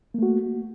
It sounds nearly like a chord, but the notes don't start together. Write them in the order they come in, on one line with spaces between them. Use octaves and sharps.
A#3 A3 F#4